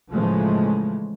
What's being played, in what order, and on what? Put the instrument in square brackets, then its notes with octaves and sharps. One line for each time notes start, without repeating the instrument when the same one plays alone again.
[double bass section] A2 C#3 E3 F3 G#3 A3